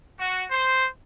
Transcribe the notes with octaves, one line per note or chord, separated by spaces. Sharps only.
F#4
C5